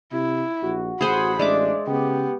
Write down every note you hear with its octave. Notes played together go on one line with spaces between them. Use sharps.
C3 E4
A#1 F#4
A1 G#4 C5 F#5 G#5 B5
A1 G#3 D4 D5 E5 D6
C#3 B3 G4